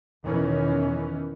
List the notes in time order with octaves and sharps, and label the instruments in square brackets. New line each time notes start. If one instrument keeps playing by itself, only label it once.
[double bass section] E2 B2 D#3 E3 C#4